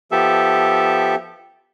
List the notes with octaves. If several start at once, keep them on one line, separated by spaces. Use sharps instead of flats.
F3 B3 G4 A4 E5